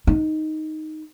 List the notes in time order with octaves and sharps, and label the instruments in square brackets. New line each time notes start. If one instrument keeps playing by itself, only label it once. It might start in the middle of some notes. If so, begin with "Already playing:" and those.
[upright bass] D#4